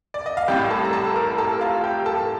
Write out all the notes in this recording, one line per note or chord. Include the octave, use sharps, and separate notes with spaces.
D5
D#5
F5
A1 A2 G3 G4 G5
A4 A5
A#5
A4 A5
A#4 A#5
A4 A5
F4 F5
G4 G5
A4 A5